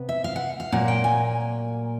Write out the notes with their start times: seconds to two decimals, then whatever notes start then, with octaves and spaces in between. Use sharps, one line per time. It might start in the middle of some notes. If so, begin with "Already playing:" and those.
Already playing: C3 B3
0.09 E5
0.24 F5
0.36 F#5
0.60 F5
0.72 A#2 F#3 A#3 F#5
0.88 G5
1.04 G#5